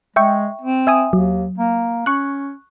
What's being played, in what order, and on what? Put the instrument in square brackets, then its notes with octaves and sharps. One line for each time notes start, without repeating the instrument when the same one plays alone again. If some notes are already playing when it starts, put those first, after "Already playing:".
[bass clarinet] G#3 [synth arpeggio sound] E5 G5 C#6
[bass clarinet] C4
[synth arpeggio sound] E5 G#5 D#6
[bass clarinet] D#2 [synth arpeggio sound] F#3
[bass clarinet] A#3
[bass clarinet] C#4 [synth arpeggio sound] C#6 F#6